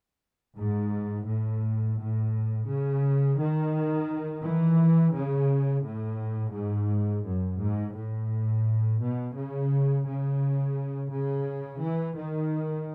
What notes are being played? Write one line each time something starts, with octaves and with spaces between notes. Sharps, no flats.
G#2
A2
A2
C#3
D#3
E3
C#3
A2
G#2
F#2
G#2
A2
B2
C#3
C#3
C#3
E3
D#3